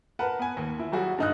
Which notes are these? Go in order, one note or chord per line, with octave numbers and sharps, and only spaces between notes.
A#4 B4 F#5 A5
B3 G#5
D#2
E4
F#3 G3 F#4 G#4
G2 D3 D#4 D#5 D#6 F#6